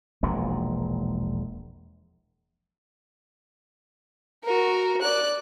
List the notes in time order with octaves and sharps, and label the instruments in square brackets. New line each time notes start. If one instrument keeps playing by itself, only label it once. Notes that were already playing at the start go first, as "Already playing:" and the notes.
[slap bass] E1 A#1 A#2 G#3
[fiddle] F#4 A#4
D5 F#6